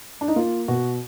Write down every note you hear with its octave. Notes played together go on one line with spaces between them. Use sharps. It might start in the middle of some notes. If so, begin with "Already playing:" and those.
D4
D#4
A#3 F4
B2 F#4